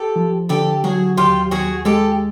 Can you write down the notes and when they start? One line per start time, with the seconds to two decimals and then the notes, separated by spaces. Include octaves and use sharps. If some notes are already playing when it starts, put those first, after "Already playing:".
Already playing: G4 A4
0.16 F3
0.49 D3 G4 A4
0.84 F#3 F#4 G#4
1.17 D#2 F4 G4
1.51 D#2 F#4 G#4
1.85 G#3 G4 A4